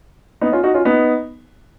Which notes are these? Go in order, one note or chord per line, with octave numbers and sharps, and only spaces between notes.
B3 D#4
C#4 F4
D#4 F#4
C#4 F4
B3 D#4